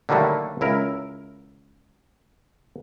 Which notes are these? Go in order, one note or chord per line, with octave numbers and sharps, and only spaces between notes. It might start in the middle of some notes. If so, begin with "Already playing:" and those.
D3 D#3 F#3 G3 A3 A#3
C#2 E4 A#4